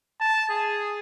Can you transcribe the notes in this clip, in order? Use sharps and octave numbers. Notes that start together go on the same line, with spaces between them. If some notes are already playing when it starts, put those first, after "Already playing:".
A5
G#4